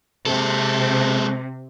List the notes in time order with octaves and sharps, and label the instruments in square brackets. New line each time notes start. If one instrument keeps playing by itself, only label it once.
[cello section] C3 [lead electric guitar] G#3 A4